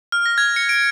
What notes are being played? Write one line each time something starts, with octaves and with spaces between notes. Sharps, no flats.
F6
A#6
G#6
C#7
D7